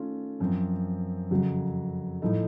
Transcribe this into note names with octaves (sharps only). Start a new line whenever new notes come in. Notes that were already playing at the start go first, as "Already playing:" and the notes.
Already playing: D#3 A3 C#4 F4
F#2 F3 C4
F2 C#3 F#3
A2 F3 A3 D#4 A4